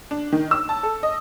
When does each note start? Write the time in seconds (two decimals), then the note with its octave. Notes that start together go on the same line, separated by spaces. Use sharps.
0.11 D4
0.32 D#3
0.51 E6
0.69 A5
0.83 A4
1.03 D#5